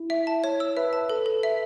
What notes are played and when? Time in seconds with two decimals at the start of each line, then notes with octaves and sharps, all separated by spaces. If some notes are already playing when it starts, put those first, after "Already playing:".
Already playing: E4
0.10 E5
0.27 A5
0.44 C#5
0.60 E6
0.77 B4 E5
0.93 A5
1.09 A4
1.26 A4
1.43 E5